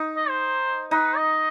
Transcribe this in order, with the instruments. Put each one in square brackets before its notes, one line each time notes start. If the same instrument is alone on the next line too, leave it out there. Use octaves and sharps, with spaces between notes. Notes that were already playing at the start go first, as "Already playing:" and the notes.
Already playing: [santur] D#4
[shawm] D#5
C5
[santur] D#4 [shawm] B4
[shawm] D#5